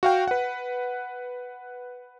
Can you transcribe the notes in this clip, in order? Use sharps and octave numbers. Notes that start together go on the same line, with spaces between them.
F#4 F5 G5
B4 F#5